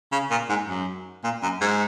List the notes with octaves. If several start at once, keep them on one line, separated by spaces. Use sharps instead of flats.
C#3
A#2
G#2
F#2
A#2
F#2
G#2